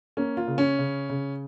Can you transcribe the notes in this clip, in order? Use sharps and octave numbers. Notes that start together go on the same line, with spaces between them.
A#3 C#4
F4
C#3
C#4
C#3
C#3